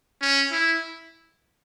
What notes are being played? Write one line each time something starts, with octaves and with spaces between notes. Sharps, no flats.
C#4
E4